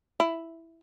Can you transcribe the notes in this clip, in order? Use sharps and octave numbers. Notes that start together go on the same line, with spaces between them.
E4